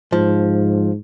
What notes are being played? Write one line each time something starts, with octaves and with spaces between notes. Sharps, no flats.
G#2 F3